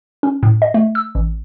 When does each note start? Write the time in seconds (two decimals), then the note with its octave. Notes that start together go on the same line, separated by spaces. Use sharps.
0.23 C#4
0.43 A2
0.62 D#5
0.74 A3
0.95 E6
1.15 A1